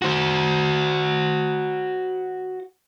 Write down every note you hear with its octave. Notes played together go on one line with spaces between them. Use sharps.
F#4 C5